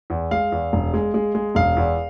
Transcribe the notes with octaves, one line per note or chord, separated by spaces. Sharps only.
E2
G#3 F5
E2
E1
G#3
G#3
G#3
E1 F5
E2